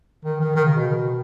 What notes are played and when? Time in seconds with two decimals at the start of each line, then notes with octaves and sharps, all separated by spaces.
0.25 D#3
0.40 D#3
0.56 D#3
0.65 C#3
0.76 B2